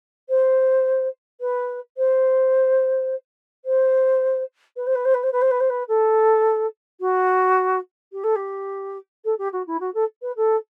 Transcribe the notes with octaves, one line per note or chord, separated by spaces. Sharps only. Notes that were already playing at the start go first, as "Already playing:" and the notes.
C5
B4
C5
C5
B4
C5
B4
C5
B4
C5
B4
C5
B4
C5
B4
A4
F#4
G4
A4
G4
A4
G4
F#4
E4
F#4
A4
B4
A4